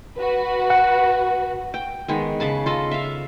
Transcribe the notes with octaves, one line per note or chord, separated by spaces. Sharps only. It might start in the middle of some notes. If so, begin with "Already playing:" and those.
F#4 B4
F#5
G5
D#3 G#3 B3
C#3 A5 B5
F4 A4 D#5
E5 F5